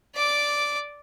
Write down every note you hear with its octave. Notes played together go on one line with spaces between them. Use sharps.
D5 D6